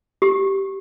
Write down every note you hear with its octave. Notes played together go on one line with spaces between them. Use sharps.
G4